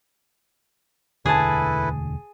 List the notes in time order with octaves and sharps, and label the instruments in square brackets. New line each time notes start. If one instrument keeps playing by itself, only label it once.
[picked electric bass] E1 D2 D3 [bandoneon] E4 A4 B4 [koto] G#4 A5